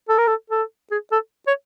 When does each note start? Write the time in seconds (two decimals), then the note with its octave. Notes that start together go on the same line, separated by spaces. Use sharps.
0.09 A4
0.18 A#4
0.27 A4
0.50 A4
0.91 G#4
1.12 A4
1.47 C#5